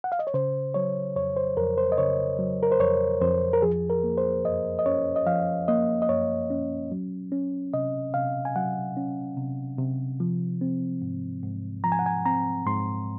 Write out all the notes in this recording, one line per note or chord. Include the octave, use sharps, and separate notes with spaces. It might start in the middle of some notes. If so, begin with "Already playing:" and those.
F#5
F5
D#5
C#5
C#3 C5
F#3 C#5
F2 C#5
C5
F2 A#4
C5
D#5
C#3 C#5
F#3
A#4
C5
F2 C#5
F2 C5
A#4
F3 G#4
A#4
A#3
C5
F#2 D#5
D#5
C#4 C#5
D#5
F3 F5
A#3 D#5
D#5
F#2 C#5
C#4
F#3
C#4
C3 D#5
C3 F5
G#5
F#3 F#5
C#4
C3
C3
F3
C4
G#2
G#2
F3 A#5
G#5
F#5
G#5
C4 A#5
G#2 C6